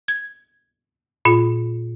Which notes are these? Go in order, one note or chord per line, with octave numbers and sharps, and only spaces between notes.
G#6
A#2 F4